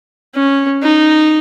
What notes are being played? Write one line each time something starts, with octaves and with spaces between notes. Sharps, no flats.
C#4
D#4